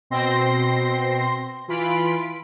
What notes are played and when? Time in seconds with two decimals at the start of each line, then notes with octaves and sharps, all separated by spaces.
0.10 B2 C4 C6 A#6
1.68 E3 F4 B5 D7